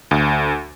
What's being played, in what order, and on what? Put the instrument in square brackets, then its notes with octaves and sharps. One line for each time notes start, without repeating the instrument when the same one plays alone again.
[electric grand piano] D2